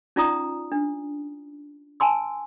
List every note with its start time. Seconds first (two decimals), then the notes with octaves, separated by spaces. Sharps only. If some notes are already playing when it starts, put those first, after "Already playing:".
0.16 C#4 D#4 F4 D5 A#5 D#6
0.72 D4
2.00 G#5 A5 C6 E6